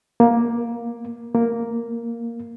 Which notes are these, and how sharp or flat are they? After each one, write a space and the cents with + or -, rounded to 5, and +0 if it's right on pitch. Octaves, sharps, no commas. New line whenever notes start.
A#3 +15
A#3 +0